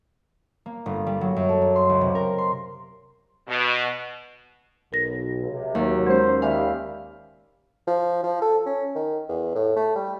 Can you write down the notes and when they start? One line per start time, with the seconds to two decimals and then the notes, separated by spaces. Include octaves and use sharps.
0.66 A#3
0.86 G1
1.07 G3
1.21 F#3
1.36 F#2
1.49 A4
1.62 A#3
1.76 C6
1.89 C#2
2.01 C3
2.15 A#4
2.38 C6
3.48 B2
4.93 B1 A#4 A#6
5.42 C#2 C3
5.75 D#2 F#3
6.07 G#3 C#4 C5
6.42 D#2 G3 E5 F5 G#5
7.87 F3
8.23 F3
8.41 A4
8.66 C#4
8.95 D#3
9.29 E2
9.55 A2
9.76 A3
9.96 G3